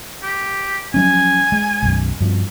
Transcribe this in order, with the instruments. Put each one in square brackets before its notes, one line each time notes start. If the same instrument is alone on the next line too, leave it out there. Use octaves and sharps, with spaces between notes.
[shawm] G4
[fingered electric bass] F3 F#3 C#4 [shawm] G#5
[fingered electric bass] G#3
B1 F#2
G2 F3